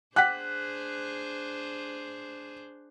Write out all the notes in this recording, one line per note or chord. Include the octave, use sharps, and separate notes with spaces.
D4 G#4 C5 F#5 G5 D6 F#6 B6